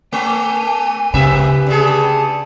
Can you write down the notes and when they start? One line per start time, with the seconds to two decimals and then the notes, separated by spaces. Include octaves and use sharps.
0.12 A3 G#5
1.14 G2 C#3 A#3 G4 B4 E5
1.67 D3 A3 G#4